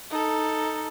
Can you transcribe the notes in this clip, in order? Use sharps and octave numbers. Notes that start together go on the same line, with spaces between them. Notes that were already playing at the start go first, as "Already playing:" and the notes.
D#4 A4